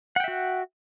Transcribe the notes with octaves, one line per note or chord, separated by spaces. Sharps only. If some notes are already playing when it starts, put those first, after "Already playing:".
F#4 E5 F#5 G5